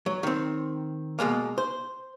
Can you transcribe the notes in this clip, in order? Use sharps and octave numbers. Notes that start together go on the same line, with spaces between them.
F#3
D#3 C4
B2 F3 G#3 A#3
C5